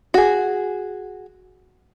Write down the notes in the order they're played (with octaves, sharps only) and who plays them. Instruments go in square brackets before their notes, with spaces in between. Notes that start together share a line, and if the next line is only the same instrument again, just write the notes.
[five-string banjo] F#4 G#4